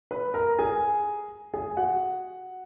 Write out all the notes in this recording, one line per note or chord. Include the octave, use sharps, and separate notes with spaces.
B4 B5
A#4 A#5
G#4 G#5
G#4 G#5
F#4 F#5